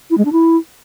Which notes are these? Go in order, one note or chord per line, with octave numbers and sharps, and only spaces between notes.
E4
G#3
D4
E4